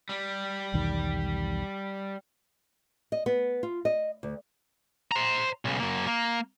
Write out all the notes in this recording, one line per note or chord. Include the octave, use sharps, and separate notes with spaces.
G3
B1 E2 D#3
D#5
B3
F4
D#5
D2
C5 A#5
B1 C#3
F#2 A#3
A#3